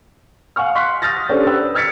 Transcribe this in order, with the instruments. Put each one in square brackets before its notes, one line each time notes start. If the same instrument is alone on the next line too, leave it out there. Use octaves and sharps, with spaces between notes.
[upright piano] F5 F#5 G#5 C#6 F6
C6 C#6 F#6 B6
D#6 F6 G6 A6 A#6
C#4 D4 G4 A4 C5 C#5
B4 G5 E6 F#6
E6 F6 G#6 A6 B6 C#7